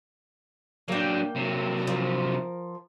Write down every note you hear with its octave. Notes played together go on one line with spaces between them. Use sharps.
F#3 A#3 D4 G5
C3 F#3
F3 A#4